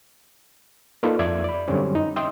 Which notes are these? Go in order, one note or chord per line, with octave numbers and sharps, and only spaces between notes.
A#3 D#4 F4 A4 B4 D5
F2 D5 E5 G#6
D5 B5
F#2 D3 G3 C4 C#4
D#4
D#5 E5 G5 C6 D#6 E6